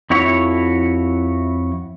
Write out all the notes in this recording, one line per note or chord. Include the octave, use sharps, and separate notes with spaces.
F2 E4 F#4 C#5